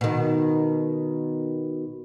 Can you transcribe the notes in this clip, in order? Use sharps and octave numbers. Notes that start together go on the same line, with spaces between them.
B2 D#3